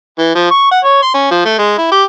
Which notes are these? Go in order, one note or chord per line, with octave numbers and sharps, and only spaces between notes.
E3
F3
C#6
F#5
C#5
C6
C#4
F3
A3
G#3
E4
G4